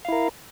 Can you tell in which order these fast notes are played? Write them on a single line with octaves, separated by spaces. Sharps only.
F5 E4 A#4